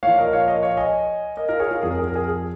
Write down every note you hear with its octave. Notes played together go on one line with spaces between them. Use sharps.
A#2 F3 C#5 F5
A#4 D#5
C#5 F5
A#4 D#5
C#5 F5
D#5 G#5
A#4 D#5
F4 A#4
G#4 C#5
F4 A#4
F2 F3 G#4
A#4
G#4
A#4
G#4
G#4